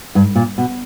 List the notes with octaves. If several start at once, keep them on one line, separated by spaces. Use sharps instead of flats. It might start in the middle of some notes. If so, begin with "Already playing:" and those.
G2
A#2
B2